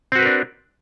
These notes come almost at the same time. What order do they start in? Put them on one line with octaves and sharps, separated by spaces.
C4 F#4 B4 A#4 D4